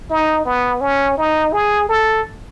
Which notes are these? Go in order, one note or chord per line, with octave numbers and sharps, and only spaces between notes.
D#4
B3
C#4
D#4
G#4
A4